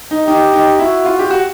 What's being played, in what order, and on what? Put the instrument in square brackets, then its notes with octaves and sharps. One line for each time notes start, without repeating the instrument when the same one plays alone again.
[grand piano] D#4
[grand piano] D#4 [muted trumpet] G4
[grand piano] D#4
[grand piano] E4 [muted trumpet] F#4
[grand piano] F4
G4
F#4